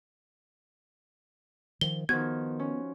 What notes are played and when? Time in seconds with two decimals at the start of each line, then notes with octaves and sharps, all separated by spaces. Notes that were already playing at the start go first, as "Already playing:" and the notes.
1.81 D#3 F3 G7
2.09 D#3 F3 B3 F#4 G#6
2.60 C#4